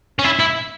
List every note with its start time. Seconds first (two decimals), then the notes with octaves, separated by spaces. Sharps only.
0.19 C#4
0.24 E4
0.39 E4